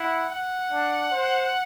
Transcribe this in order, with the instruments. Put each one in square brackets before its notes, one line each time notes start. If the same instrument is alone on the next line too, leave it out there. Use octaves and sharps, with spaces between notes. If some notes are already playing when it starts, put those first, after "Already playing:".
Already playing: [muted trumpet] E4 [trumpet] F#5
[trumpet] F#5
[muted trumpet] D4
C5